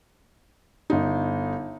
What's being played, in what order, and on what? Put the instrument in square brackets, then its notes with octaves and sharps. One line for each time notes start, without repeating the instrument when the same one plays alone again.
[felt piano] G1 D#4